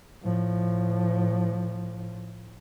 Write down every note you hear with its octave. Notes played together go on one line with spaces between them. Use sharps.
A2 F3